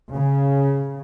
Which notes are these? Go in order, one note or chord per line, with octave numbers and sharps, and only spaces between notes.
C#3